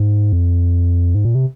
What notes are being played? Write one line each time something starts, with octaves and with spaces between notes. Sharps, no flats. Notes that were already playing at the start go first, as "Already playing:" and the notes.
Already playing: G#2
F2
G#2
A#2
C3